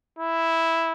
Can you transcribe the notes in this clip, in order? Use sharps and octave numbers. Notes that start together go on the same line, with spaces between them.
E4